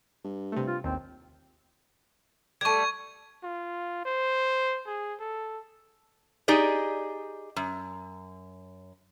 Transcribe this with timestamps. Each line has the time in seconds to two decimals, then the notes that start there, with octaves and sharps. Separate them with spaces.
0.25 G2
0.52 C3 A3
0.67 F4
0.84 A1 D#2 C4
2.61 G3 A3 C#6 G#6
3.44 F4
4.05 C5
4.87 G#4
5.20 A4
6.48 D#4 G4 G#4 D5 D#5
7.56 F#2